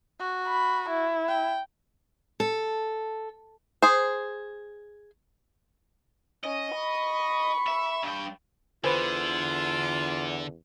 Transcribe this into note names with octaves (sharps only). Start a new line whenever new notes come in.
F#4
B5
E4
G5
A4
G#4 C5
C#4 D#5
B5 C#6
E5
G2 G5
E2 D3 F4 B4 C5 G#5